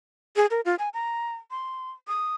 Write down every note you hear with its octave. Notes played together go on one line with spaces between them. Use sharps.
G#4
A#4
F4
G#5
A#5
C6
D#6